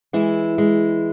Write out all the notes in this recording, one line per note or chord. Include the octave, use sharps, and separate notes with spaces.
E3 G#3 E4
G#3